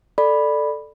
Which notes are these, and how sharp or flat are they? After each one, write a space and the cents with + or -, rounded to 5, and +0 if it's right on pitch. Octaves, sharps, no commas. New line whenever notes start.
A4 +0 D5 +15 B5 +0